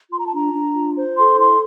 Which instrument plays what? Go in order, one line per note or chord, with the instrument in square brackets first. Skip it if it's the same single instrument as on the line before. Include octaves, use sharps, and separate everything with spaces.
[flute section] F4 C6
A#5
A5
D4 A#5
D4
F4
C5
A4 C6
E4 C6